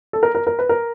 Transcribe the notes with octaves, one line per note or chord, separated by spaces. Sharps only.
A4
A#4
A#4
A#4
B4
A#4